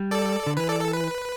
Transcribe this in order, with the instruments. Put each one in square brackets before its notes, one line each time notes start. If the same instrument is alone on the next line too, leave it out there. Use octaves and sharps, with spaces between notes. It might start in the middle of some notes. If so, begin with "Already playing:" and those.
Already playing: [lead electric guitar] G3
[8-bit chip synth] A4 D5
[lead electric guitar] D3
[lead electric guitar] E3 [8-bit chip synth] B4
[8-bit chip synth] A4 D5
A4
B4